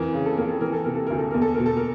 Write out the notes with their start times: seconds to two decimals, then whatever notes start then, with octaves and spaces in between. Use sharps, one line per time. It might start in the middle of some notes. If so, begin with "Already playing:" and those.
Already playing: F2 E3 A#4
0.14 C#3
0.26 A4
0.37 F2 A#4
0.49 A4
0.61 E3 A#4
0.72 A4
0.84 C3 A#4
0.95 A4
1.07 D2 A#4
1.18 A4
1.31 E2 A#4
1.42 A4
1.54 B2 A#4
1.66 A4
1.77 A#4